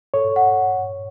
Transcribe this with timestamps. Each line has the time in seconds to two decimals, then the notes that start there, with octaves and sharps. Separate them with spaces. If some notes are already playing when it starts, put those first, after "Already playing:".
0.14 A4 C#5
0.36 F#5